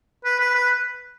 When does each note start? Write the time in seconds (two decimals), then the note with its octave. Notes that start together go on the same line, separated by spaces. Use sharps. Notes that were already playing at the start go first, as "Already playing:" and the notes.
0.25 B4
0.40 B4
0.55 B4